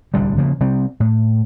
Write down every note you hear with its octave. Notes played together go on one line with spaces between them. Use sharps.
D1 C2 D3 G3
C#3 F3 G3 A#3
C3 G3 C4
A2